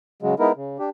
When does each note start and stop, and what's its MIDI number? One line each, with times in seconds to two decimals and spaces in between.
0.22 0.35 49
0.22 0.35 54
0.22 0.35 56
0.39 0.52 56
0.39 0.52 59
0.39 0.52 63
0.39 0.52 64
0.39 0.52 70
0.56 0.78 49
0.79 0.90 62
0.79 0.90 67